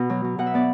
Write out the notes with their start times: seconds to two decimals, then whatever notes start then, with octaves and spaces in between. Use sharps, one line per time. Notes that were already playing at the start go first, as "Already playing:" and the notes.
Already playing: B2
0.10 F#3
0.24 F#3
0.39 B2 F#5
0.47 E5
0.54 B3 D5